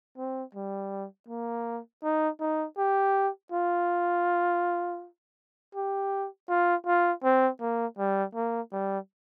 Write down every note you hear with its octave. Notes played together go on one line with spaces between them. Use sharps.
C4
G3
A#3
D#4
D#4
G4
F4
G4
F4
F4
C4
A#3
G3
A#3
G3